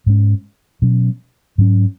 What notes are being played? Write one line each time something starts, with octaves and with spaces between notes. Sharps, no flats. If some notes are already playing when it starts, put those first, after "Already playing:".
G#2 G#3 C#4
B2 F#3 C#4
G#2 F#3 C#4